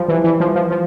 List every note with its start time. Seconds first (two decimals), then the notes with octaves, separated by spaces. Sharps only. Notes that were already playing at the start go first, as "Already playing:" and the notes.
Already playing: F3 G3
0.08 E3
0.24 E3
0.40 F3
0.56 F3
0.71 F3